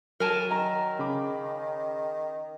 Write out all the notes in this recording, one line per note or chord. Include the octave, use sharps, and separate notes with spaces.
F#3 A#4 G#5 A5
D#3 A#5
C#3 B5 D6